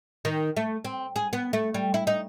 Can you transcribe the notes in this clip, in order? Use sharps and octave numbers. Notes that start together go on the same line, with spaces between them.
D#3
A3
C4
G#4
B3
A3
G3
E4
D#4